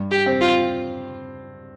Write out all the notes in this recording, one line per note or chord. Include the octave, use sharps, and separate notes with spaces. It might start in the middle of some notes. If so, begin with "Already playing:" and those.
Already playing: G2
G4
C4
F4